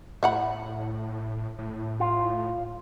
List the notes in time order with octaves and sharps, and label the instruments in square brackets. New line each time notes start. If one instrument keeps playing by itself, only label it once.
[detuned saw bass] A2 [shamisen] E5 F#5 B5
[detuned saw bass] A2
[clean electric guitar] F4